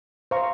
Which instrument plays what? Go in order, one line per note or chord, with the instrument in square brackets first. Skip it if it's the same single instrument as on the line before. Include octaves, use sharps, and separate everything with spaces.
[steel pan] C5 F5 A#5 C#6